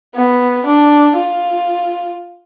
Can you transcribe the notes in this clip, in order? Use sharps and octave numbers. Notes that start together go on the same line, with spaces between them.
B3
D4
F4